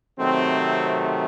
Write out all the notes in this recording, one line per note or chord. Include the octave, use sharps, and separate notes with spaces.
C3 D#3 F#3 A3 C4